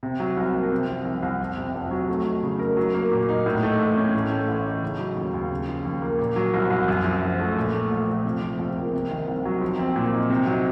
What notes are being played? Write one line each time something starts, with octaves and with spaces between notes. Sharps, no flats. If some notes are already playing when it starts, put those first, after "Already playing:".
C3
F#3
C2
A#3
C3
F3
C2
C2
F2
C3
F1
F#3
A3
D#4
C#3
A#4
F#3
A#3
A#2
D#4
A2
A3
A1
C#4
A2
A3
A1
D#4
C#3
F#3
D#2
D#2
C#3
F3
D#2
A#3
A#2
F#3
C2
C2
F#2
F3
F#1
A3
A#2
A3
A#1
A#1
C3
F3
C#2
A#3
C3
D#3
C2
F#3
F3
C4
A#2
D#4
C3
F#3